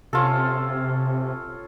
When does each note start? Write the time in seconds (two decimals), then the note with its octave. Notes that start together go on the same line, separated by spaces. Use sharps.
0.13 C3 C#4 F4 A4